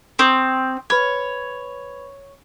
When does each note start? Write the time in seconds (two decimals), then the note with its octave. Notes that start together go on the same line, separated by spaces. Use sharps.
0.19 C4 C6 C#6 D#6
0.90 B4 C#5 B5 G#6